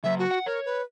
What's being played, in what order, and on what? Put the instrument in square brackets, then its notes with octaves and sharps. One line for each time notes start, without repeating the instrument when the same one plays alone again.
[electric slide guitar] C#3 F#3 [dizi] E5
[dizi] F#4
[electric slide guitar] F#5
[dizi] A#4 [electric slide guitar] C#5
[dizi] B4